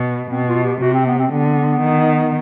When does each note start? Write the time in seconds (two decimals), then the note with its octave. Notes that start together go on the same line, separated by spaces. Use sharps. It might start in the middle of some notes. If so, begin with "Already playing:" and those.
Already playing: B2
0.30 B2 C4
0.48 F4
0.64 G4
0.81 C3 F#4
0.94 C4
1.06 B3
1.19 C4
1.31 D3 B3
1.82 D#3